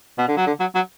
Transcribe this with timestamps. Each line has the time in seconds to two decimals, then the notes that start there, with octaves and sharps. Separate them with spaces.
0.18 B2
0.28 D3
0.37 F#3
0.47 D3
0.60 F#3
0.75 F#3